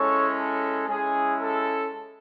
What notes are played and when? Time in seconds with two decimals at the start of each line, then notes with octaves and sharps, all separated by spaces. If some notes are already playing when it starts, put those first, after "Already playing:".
Already playing: G#3 C#4 E4 A4 C#5
0.35 A4
0.88 G#3 C#4 E4 G#4
1.42 A4